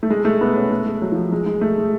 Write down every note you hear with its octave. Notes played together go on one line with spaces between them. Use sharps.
A3
G#3
A3
B3
C#4
A3
G#3
F#3
F3
G#3
G#3
A3
G#3